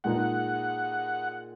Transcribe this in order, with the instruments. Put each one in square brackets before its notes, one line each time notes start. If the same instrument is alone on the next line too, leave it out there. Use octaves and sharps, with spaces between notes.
[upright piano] A#2 G#3 D#4 G#4 [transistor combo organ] F#5